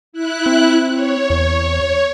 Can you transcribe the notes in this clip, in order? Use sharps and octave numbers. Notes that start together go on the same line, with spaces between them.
E4 F#6
C4
C#5
E2